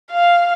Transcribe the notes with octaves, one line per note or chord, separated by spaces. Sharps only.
F5